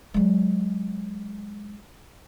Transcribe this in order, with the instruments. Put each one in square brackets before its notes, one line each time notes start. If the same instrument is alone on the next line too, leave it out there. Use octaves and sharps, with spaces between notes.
[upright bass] F#3 G#3